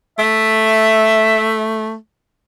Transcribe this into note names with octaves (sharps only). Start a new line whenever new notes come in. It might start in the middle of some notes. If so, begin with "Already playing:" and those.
A3 E5